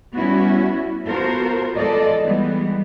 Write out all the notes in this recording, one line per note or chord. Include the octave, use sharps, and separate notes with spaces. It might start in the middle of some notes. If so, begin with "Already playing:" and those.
G3 B3 C#4 E4 F#4
B3 F4 F#4 A4 A#4 C5
E3 G#3 F4 A4 D5 D#5
E3 G3 G#3 B3